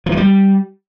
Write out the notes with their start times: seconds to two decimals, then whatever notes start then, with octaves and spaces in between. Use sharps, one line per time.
0.06 F3
0.12 E3
0.17 G3